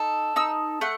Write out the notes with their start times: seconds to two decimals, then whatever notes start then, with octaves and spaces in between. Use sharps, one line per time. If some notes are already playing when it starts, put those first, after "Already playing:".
Already playing: D#4 A4
0.36 D#4 E6
0.81 A3 F#5